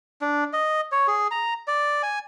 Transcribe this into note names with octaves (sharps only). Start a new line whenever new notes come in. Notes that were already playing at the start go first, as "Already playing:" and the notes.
D4
D#5
C#5
G#4
A#5
D5
G#5